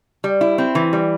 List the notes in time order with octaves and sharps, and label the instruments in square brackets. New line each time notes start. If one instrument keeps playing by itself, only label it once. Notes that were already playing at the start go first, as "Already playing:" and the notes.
[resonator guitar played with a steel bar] G3
E4
C4
E3
G3